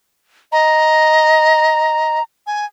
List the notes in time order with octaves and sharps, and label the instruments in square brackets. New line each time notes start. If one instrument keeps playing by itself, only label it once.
[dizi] D#5 [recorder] A#5
[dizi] G#5